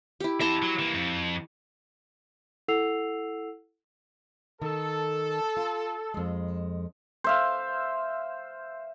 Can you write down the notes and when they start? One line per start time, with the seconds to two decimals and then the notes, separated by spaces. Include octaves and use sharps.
0.20 E4 G4
0.40 F2 E4 A5 A#5 C6
0.62 F#3
0.79 E3 A#3
0.94 F2
2.68 E4 A4 F#5 E6 C7 F7
4.62 D#3 A4
5.57 F4
6.14 F2 G#3
7.24 C5 E5 F5